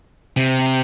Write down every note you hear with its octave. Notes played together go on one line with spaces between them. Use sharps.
C3